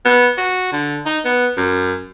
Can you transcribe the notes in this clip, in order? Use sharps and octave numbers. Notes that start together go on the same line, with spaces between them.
B3
F#4
D3
D#4
B3
F#2